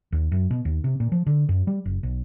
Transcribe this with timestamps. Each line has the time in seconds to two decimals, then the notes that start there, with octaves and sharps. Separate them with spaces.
0.12 D#2
0.32 F#2
0.51 B2
0.65 D#2
0.84 C3
1.00 A#2
1.12 F3
1.26 D3
1.49 F#2
1.67 G3
1.85 F#1
2.03 B1